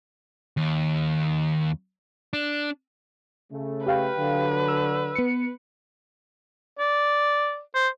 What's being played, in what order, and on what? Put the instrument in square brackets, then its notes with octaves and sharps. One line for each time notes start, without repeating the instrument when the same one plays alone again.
[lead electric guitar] D#2
D4
[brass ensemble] C#3 A3
[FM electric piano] G4 F5 G5 [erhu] B4
[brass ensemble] D3 F#3
[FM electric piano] E6
B3 C#7
[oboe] D5
C5